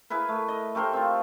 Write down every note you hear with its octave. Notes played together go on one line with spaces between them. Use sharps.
E4 G#4 A#4 B4
A3
D#5
A3 G4 A#4 C5
C4 F4